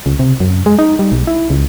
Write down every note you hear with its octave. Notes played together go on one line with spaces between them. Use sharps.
C#2
C3
F#2
G#3
D#4
G3
B1
E4
C#2